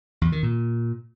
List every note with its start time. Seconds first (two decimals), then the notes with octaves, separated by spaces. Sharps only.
0.21 E2
0.32 D#3
0.43 A#2